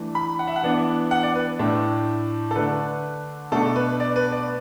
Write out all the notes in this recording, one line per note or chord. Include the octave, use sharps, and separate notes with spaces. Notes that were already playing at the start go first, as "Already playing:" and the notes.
Already playing: E3 A3 D4
B5
F#5
E5
F#5
E3 B3 D4
F#5
D5
B4
A2 A3 D4
A4
D3 A3 D4 B4
B2 A3 D4 A4
B4
D5
B4
D5